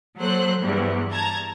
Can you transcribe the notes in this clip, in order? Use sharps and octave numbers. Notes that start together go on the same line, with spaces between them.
F#3 A#3 A4 C5 F#6
E2 G2 G3
A5 A#5 G#6